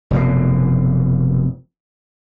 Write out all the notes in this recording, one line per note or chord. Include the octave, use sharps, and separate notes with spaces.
F1 F#2 B2